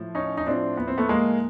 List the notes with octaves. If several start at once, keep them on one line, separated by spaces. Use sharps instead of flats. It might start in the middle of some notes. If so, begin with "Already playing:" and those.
Already playing: A2 F3
C#4 D#4
D#4
A2 F3 C4 D4
B3
C4
A3 B3
G#3 A#3